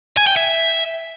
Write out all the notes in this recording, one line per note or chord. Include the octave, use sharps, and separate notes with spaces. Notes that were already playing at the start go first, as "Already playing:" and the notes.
G#5
G5
E5